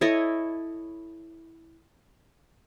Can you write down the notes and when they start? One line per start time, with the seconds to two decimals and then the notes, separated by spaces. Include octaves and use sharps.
0.01 E4 A4 C#5 D#5